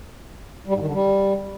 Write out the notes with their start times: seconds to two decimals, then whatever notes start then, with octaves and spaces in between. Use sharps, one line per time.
0.67 G3
0.74 G#2
0.80 D#3
0.87 D3
0.93 G3